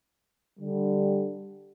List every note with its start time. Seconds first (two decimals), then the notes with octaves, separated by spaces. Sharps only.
0.60 D3 G3